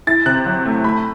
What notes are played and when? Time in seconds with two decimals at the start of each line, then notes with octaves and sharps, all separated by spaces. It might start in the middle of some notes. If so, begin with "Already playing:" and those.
0.07 E4 A6
0.26 C3 F#6
0.46 F#3
0.65 A3
0.84 A3 B5